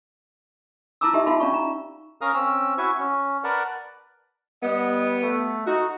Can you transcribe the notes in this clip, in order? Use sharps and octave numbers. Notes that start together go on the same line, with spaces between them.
E4 F4 A5 A#5 D6 E6
D#4 G4 D#5 E5
D#4 F4 F#4 F5 A5 B5
C#4 D4 D5 F5 C#6
A#5
C#4 A#4 F5 A#5 D#6 F6
C4 C#4 E6
E4 F#4 E5 G#5 C#6
C#4
A#4 B4 D5 F#5 A5
G3 B3 D#5
A3
D#4 F#4